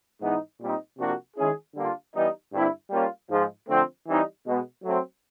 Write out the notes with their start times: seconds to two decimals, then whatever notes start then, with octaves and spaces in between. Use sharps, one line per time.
0.21 G#2 E3 G#3 B3 D#4
0.60 A#2 G3 C4 D#4
0.98 C3 F3 A#3 D4 F#4
1.36 D#3 G#3 C#4 E4 G#4
1.75 D3 G3 A#3 D4 F4
2.14 E3 G3 B3 D#4
2.53 G2 D3 G3 C4 E4
2.91 G3 A#3 C#4 F4
3.29 G#2 F3 G#3
3.68 D3 F3 A3 C4
4.07 E3 G3 C4 D#4
4.45 B2 G#3 B3
4.84 F#3 A3 C4